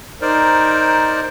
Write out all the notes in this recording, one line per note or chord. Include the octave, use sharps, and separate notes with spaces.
D#4 A#4 C5 D5